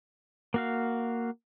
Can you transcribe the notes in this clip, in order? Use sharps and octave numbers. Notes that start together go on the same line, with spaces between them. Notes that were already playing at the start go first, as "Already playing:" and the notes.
A#3 F#4 F5